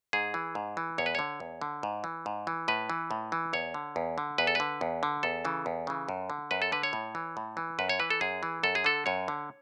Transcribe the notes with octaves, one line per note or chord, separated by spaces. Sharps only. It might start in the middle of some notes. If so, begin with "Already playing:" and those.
G#2 G#4
E3
G#2
E3
E2 C#5
B4
D3 C#5
E2
D3
G#2
E3
G#2
E3
A2 B4
E3
A2
E3
E2 C#5
D3
E2
D3
E2 B4
A4
D3 B4
E2
D3
E2 A4
C#3 E3
E2
C#3 E3
F#2
D3
F#2 B4
A4
D3 B4
C#5
A2
E3
A2
E3
F#2 B4
C#5
E3 B4
A4
F#2 G#4
E3
F#2 A4
G#4
D3 A4
F#2 C#5
D3